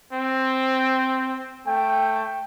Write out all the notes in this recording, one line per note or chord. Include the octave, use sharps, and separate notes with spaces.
C4
A3 G5